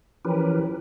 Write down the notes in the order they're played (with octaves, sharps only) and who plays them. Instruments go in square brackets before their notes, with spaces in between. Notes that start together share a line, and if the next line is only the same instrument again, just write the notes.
[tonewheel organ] E3 F3 C#4 G4 A#4 B4